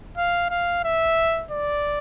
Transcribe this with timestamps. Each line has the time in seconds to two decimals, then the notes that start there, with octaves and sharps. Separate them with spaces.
0.17 F5
0.50 F5
0.85 E5
1.51 D5